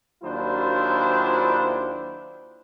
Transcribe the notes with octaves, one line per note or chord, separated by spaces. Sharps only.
D#2 F#3 D4 E4 F4 C5